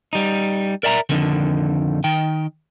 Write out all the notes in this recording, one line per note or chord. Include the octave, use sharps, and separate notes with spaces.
G3 D#4
A#4 D5 E5 A5 A#5
F2 D3 D#3
D#3 G5